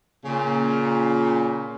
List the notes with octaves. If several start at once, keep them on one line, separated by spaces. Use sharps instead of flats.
A#2 C#3